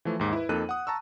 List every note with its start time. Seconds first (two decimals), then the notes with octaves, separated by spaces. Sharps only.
0.05 E3 F3 A3
0.19 D#2 G#2
0.33 E4 B4
0.49 F2 A#3 D#4 A4 F#6 D#7
0.69 F#5 D#6
0.87 A5 A#5 C#6 E6